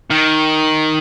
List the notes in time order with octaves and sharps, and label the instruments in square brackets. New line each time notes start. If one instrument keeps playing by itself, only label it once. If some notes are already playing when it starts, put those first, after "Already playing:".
[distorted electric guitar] D#3